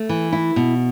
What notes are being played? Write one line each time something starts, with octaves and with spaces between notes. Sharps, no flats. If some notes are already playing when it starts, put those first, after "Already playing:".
Already playing: A3
E3
E4
B2